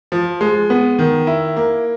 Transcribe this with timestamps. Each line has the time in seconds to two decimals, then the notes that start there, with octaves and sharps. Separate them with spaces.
0.12 F3
0.41 G#3
0.70 B3
0.99 D#3
1.27 E4
1.56 A#3